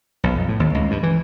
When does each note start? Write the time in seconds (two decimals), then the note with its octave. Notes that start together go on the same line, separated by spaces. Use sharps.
0.24 B1
0.35 F2
0.49 A2
0.60 D#2
0.75 C#2
0.91 G2
1.03 E3